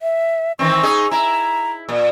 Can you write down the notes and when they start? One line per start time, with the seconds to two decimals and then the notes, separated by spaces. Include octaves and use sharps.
0.02 E5
0.59 D#3 E3 C4 C#6
0.83 D#4 G#4
1.11 E4 A#5
1.89 A#2